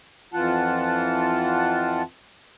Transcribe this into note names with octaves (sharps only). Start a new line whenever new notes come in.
F2 E3 F4 F#5 A5